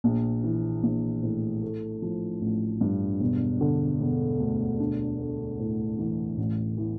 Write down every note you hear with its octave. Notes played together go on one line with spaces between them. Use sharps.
A#1
E3
A#1
A2
A3
F3
A1
G2
E1
D3
E1
D2
D4
A3
A2
E3
A1
E3